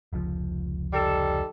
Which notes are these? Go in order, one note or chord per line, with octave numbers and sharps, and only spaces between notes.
F1 C#2 F3
D#3 G3 A4